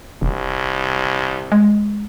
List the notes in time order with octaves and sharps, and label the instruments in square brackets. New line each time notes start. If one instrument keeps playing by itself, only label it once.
[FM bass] E1 [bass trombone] C2
[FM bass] G#3